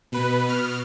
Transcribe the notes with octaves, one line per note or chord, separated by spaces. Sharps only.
B2 B4
B2 F6